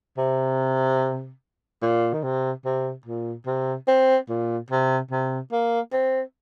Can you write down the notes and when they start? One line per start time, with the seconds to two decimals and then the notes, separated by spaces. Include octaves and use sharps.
0.17 C3
1.82 A#2
2.13 D#3
2.23 C3
2.65 C3
3.06 A#2
3.46 C3
3.88 C4
4.29 A#2
4.70 C3
5.11 C3
5.52 A#3
5.93 C4